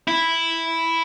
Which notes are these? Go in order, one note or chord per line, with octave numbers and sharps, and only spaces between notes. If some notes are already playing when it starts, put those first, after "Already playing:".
E4